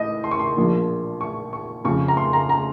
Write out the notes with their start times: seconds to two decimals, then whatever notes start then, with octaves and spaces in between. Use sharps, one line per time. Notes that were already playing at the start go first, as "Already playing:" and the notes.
Already playing: A1 A2 D#5
0.24 C6
0.31 C#6
0.39 C6
0.56 A#1 A#2 F3
1.21 C#6
1.53 C#6
1.84 F2 C#3 F3 C#6
2.08 A#5
2.17 C6
2.33 A#5
2.49 A#5